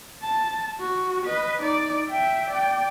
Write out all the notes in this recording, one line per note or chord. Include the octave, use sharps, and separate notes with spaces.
A5
F#4
B4 D#5
D#4 D5
E5 G5
D5 G5